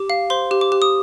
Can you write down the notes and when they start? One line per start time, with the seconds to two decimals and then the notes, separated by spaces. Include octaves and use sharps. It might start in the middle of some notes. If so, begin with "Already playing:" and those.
Already playing: G4 D6
0.10 F5
0.30 C5 C6
0.51 G4
0.61 D6
0.72 G4
0.82 D#6